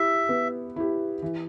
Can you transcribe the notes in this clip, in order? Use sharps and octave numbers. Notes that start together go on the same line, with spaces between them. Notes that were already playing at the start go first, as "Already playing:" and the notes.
Already playing: E4 G4 E5
B3
E4 G4
E3